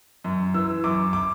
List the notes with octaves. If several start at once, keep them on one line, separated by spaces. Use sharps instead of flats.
F#2
E3 E6
F#2 D6
D6